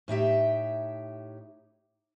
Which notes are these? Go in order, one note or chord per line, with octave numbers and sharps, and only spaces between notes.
A2 D#4 G4 E5